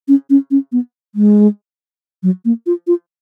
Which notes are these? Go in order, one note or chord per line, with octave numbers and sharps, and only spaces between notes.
C#4
C#4
C#4
B3
G#3
F#3
A#3
F4
F4